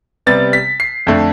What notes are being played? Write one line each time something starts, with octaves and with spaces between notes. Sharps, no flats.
C3 G3 B3 A6
B6
C7
F2 D3 A3